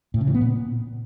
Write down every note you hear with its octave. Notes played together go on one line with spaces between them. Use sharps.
A2
C#3
E3
B3
A#2